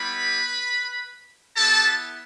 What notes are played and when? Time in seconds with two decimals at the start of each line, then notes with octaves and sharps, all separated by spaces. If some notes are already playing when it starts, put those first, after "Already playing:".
Already playing: G3 B3 E4 G4 B4 B5
1.56 B3 E4 G4 A4 A5